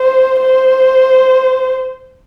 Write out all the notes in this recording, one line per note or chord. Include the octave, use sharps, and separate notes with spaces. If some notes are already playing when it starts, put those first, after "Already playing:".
Already playing: C5
C5